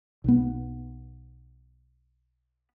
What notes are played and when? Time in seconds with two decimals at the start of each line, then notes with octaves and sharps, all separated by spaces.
0.24 B1 B3